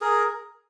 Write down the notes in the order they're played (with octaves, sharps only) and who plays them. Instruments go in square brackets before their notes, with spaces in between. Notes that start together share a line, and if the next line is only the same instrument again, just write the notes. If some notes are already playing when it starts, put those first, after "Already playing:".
[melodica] G#4 A#4